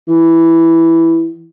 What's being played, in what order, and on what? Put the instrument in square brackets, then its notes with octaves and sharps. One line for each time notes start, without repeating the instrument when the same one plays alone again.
[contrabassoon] E3